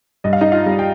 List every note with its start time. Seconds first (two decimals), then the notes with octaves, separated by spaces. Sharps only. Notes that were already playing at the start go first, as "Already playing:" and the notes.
0.24 G2 D#5
0.33 F5
0.41 D#4 D#5
0.52 F4 F5
0.66 G3
0.79 G5